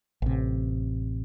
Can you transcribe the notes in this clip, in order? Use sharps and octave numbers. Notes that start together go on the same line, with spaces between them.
A1 C3